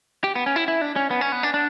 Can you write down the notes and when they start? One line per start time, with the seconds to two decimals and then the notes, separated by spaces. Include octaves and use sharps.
0.24 G4
0.36 B3
0.46 C#4
0.56 E4
0.68 E4
0.81 D4
0.96 C#4
1.11 B3
1.21 C#4
1.32 B3
1.43 D4
1.54 D4